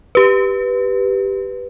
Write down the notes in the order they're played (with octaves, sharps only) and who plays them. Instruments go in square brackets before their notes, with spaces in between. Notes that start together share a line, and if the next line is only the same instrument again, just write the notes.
[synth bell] G4 B4